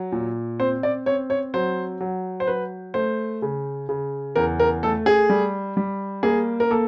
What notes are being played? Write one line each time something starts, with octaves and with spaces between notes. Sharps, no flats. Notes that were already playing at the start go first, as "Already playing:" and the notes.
Already playing: F#3
A#2
C4 C5
D5
C4 C#5
C#5
F#3 C5
F#3
C5
F#3 B4
A3 C5
C#3
C#3
E2 A#4
A#4
A3 A4
G#4
G3
G3
A#3 G#4
A#4
A#3 A4